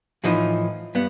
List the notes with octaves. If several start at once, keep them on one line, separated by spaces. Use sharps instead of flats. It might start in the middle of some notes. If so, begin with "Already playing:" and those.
A2 E3 F3 D#4
G2 B3